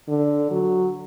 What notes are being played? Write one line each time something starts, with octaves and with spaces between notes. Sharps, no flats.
D3
F#3